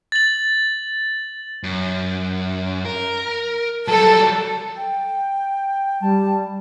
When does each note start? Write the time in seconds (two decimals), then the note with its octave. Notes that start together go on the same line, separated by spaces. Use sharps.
0.12 A6 F#7
1.64 F#2
2.86 A#4
3.88 F#3 G3 A4
4.76 G5
6.01 G3 A5